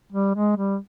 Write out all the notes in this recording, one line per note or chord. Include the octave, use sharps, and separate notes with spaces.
G3
G#3
G3